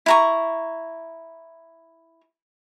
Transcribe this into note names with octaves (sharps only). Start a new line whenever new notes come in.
E4 A#5 C#6